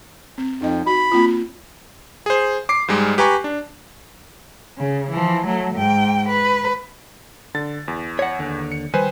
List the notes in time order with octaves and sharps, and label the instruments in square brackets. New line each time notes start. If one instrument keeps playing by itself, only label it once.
[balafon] C4
[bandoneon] F2 [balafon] D#4 D#5
[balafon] F#4 [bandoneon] B5
[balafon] A#3 C4 F4
[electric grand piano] G#4 C5
D6 C7
G#2 G3 G#3
G4 B4 G#5 A#5 C#6
D4
[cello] C#3
E3 F3
F#3 A3
G#2 G5
B4
[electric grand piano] D3 A6
E2
[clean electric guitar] C#5 F#5
D#2 D3
[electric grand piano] C#7
[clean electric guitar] D#3 G3 [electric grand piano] B4 C5 G#5